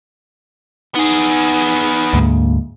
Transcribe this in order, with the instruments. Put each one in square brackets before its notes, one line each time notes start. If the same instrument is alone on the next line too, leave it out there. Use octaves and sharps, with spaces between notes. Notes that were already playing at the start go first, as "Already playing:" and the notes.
[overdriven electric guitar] B3 G#4 [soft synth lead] D#4
[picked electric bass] D2 G#2 [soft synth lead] A#3